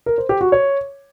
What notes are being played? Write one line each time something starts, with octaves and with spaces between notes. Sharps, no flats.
A#4
C5
G4
F#4
C#5